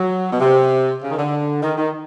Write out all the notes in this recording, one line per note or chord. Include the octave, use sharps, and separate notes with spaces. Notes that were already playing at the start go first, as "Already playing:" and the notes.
Already playing: F#3
B2
C3
C#3
D#3
D3
D#3
D#3